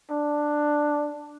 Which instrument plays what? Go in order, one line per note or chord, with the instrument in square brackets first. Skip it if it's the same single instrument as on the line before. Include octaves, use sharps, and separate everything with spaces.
[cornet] D4